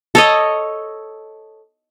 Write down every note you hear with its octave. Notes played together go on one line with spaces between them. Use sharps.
A4 C#5 D#5